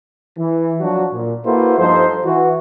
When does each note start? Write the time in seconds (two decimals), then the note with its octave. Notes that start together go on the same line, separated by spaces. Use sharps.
0.38 E3
0.80 F3 F#3 D4 F#4
1.13 A#2
1.45 A#3 E4 F#4 A4 B4 C5
1.78 G2 F3 D#4 A4 C5
2.24 E3 F#4